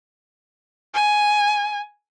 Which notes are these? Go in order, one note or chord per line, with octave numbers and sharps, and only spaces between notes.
G#5